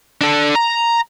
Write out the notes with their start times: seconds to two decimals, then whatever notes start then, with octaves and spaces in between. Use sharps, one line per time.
0.21 D4 A4
0.55 A#5